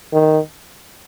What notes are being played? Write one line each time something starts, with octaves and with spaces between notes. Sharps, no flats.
D#3